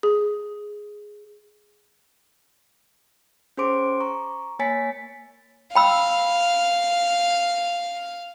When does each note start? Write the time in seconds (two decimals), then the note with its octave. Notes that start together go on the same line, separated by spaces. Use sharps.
0.03 G#4
3.57 C#4 G#4 C5 C6 D6 D7
4.00 A#5 C#6
4.59 A#3 C#5 G#5 A6 B6 C#7
5.75 F5 G5 B5 E6